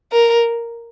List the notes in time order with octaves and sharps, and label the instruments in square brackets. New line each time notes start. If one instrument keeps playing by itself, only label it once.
[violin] A#4